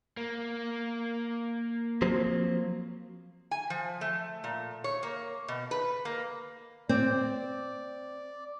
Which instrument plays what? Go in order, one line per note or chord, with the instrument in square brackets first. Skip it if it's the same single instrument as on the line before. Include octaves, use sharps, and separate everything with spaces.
[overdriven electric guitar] A#3
[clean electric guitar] F3 F#3 C4
[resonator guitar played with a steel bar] G#5
F3
A3
A#2
C#5
A#3
B2
B4
A#3
[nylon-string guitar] C4 [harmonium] D5